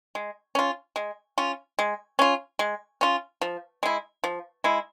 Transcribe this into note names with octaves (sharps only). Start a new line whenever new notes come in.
G#3
C#4 F4
G#3
C#4 F4
G#3
C#4 F4
G#3
C#4 F4
F3
G#3 E4
F3
G#3 E4